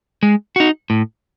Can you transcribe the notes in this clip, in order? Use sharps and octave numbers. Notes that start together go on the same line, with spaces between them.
G#3
D#4 F#4
A2